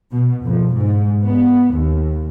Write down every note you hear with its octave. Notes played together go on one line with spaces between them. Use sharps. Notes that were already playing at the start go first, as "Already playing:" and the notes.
B2
F2
G#2
B3
D#2